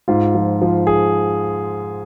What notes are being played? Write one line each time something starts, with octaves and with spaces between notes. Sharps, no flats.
G#2 F4
F3
F3
G#4